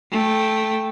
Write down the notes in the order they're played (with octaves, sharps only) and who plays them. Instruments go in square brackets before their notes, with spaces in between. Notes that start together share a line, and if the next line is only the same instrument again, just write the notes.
[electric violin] A3 G5